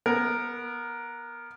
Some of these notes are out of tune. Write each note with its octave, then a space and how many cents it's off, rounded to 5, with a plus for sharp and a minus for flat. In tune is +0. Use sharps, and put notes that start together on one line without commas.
B3 -20 A#4 +0